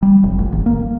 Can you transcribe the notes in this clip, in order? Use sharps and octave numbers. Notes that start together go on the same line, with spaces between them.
G3
F1
A1
G#1
A#3